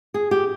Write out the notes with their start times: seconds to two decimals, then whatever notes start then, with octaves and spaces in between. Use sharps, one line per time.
0.14 G#4
0.31 G4